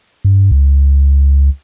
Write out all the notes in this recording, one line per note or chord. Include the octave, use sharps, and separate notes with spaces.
G2
C#2